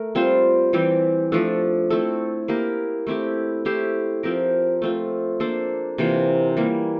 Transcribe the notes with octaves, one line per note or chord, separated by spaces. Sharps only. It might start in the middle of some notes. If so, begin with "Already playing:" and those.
Already playing: A3 A#4
G3 C4 F4 C5
E3 G3 C4 G4
F3 A3 D4 A4
A3 C4 E4 A4
A#3 E4 G4 A#4
A3 C4 E4 G4
A3 E4 G4 C5
F3 C4 G4 A#4
A3 C4 F4
A#3 D4 A4 C5
C3 E3 A#3 F4
E3 G3 A#3